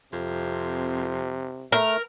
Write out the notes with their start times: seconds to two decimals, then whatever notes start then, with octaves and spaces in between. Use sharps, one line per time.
0.13 F2 C3
1.72 A3 A#4